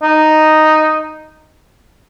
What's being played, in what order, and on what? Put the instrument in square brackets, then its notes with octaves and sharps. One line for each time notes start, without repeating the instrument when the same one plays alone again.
[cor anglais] D#4